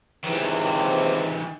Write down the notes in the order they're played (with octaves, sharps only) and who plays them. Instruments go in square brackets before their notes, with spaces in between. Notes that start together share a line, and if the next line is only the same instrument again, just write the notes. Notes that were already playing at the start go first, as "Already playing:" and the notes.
[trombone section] C#2 C3 [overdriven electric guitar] D#3 E3